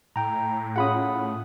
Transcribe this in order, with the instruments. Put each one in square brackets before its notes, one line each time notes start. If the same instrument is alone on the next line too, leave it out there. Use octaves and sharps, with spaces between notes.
[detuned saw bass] A2 [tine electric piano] G5 A#5
[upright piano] C#4 F4 G#4 [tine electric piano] F#5 B5 D#6